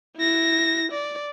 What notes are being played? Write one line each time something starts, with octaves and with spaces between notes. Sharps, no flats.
E4 A#6
D5